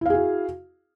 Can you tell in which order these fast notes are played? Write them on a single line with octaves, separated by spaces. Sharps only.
E4 F5 G#4 F#4